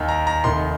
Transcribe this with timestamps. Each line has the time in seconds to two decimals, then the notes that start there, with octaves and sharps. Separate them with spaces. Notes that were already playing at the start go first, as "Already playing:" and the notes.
Already playing: D#2 D#3 G5
0.09 A#5
0.27 A#5
0.44 F1 D#2 D#3 C6